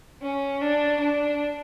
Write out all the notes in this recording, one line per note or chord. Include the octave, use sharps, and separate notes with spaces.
C#4
D4
D4